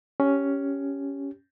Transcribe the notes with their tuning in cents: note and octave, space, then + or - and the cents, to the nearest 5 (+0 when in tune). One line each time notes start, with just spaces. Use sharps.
C#4 +5 G4 +0